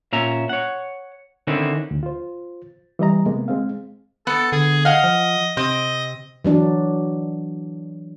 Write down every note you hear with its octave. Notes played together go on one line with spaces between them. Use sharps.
A#2 C#4 E5 A#5
C#5 F#5
D3 D#3 C4 C#4 E4
D2
F4 C5
E3 G3 D#5 A#5
C3 G#3 A#3 B3
G#3 C4 F5
B3 A4
D3 G#4
D#5 F5 F#5
F3
C3 C4 D#5
E3 F#3 D4